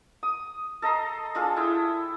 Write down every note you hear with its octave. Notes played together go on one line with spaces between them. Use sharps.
D#6
A4 D#5 A#5 C6
G#3 D4 F4 A4
E4 G5 D#6